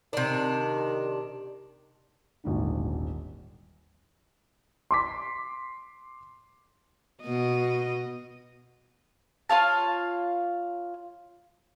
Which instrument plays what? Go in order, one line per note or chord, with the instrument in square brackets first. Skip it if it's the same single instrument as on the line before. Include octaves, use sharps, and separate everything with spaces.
[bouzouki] C3 D4 [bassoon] D#3
[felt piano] D#1 G#1 G#2 D3
[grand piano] C6 D6 B6
[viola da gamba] B2 D#5
[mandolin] F4 C#5 F5 A5